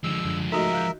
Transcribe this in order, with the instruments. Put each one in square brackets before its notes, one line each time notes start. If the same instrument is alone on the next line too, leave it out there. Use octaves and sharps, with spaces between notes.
[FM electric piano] D3 D#3 [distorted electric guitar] F3 G#3 [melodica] E6
[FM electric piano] F#2 D3
[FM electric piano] A3 A4 [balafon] D#4 F#4 D#5 [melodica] A#4 E5
[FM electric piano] F5 F#6 G6